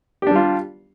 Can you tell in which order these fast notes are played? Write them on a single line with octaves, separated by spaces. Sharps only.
G4 D4 G3 F4